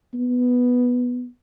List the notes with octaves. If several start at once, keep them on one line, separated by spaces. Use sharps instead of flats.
B3